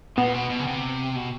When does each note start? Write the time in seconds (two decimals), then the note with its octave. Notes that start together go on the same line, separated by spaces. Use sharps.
0.17 A#2 B3
0.34 B2
0.50 B2
0.59 C#3
0.67 C3
1.16 B2